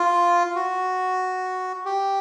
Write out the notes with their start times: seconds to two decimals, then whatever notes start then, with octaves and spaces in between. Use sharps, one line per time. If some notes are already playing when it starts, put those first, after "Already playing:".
Already playing: F4
0.56 F#4
1.85 G4